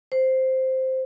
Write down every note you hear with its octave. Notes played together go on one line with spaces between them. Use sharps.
C5